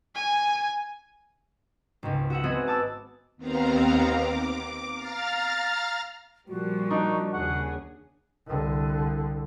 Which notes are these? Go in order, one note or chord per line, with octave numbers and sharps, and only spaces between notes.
G#5
G#1 C#2
F#4 E5 F#5
B3 C4 F#4 G#4 D#5
A5 D6 E6
D#2 B3 C4 F5 A#5
D6
F5 A#5 F6 A6
A#2 F3 G3 F#4
D4 D#4
D#2 C#3 G#4 F#5
C2 D3